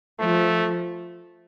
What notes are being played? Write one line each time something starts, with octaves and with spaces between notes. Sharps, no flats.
F3 A3